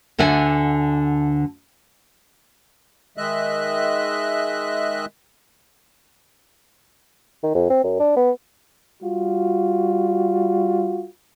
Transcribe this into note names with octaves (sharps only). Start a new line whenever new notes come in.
D2 D3 E5 F#5 G#5
D#3 G#3 D#5 E5 F#6
D#3
F2
C4
F#2
D4
B3
G3 F4 F#4